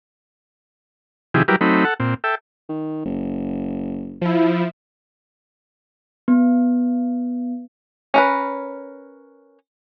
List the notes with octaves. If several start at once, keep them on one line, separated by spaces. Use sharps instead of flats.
C3 D#3 F3 E4 G4 G#4
F#3 G3 E4 G4 A#4 B4
F#3 A3 C4 D#4 B5
A4 F#5
A#2 C4
A4 E5 G5
D#3
F#1
F3 E4
B3
C#4 A#4 B4